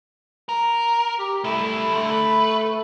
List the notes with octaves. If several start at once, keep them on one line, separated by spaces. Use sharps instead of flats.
A#4
G4
G3 A3 E4
D3 A3
B4